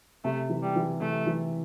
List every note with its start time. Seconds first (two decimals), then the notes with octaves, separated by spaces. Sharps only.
0.24 C3 A3
0.50 E3
0.63 G3
0.76 E3
1.01 C3 A3
1.26 E3